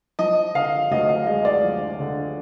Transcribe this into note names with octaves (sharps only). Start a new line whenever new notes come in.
F3 D#5
D3 F5
D2 D#5
F5
G#3 D#5
D5
F3
D3